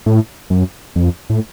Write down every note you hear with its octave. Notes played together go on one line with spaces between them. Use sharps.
A2
F#2
F2
A2